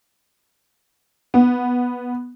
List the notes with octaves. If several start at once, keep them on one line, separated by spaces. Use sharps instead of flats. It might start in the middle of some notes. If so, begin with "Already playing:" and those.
B3